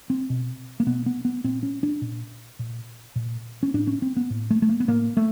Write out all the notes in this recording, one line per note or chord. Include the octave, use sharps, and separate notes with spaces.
C4
B2
A#3
B2 B3
B3
B3
A#2 C4
C#4
D4
A#2
A#2
A#2
C#4
A2 D4
C#4
C4
B3
A2
A3
A3
A#3
B3
A2 A#3
A3